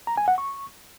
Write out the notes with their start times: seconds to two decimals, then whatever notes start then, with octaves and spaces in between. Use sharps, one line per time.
0.07 A#5
0.17 G#5
0.28 F#5
0.38 C#6